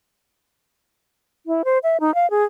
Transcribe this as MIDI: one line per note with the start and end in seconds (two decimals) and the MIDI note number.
1.46 1.62 64
1.65 1.78 72
1.83 1.97 76
2.00 2.14 63
2.15 2.29 77
2.30 2.44 68